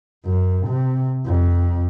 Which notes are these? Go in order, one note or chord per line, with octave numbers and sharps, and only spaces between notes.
F#2
C3
F2